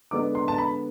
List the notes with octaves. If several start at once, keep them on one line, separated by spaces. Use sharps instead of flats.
D3 G#3 B3 D4 D6
C6
A5
B5